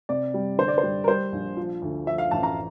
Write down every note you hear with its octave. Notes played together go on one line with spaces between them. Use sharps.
C3 D5
G3
D3 C5
D5
C5
G3
A#4
G3 C5
A#1
F3
D2
F3 E5
F5
A1 A5
A#5